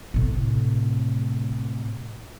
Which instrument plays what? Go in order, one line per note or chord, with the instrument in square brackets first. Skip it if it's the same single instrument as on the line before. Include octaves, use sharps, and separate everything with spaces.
[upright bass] A2 C3